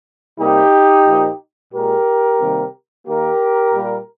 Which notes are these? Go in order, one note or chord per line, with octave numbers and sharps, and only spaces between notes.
C3 G3 A#3 D#4 G4
A#2 F3 A#3
A#2 G#3 G4 A#4
C3 D#3 G3 A#3
D#3 A#3 G4 A#4
A#2 G3 A#3